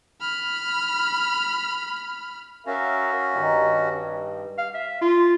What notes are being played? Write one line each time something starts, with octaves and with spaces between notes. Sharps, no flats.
B5 F6
C#4 F#4 A#4 E5 F5
G2 D#3 G3 D#5
F5
E5
F4